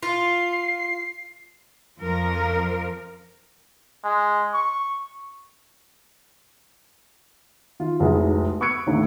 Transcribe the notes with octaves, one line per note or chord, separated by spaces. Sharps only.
F4 C7
F2 F3 A#4
G#3
C#6
D#3 F4
F1 C2 G#2 C3 F#3 G#4
C#6 E6 F#6 G#6 C#7 D7
D#2 A2 D3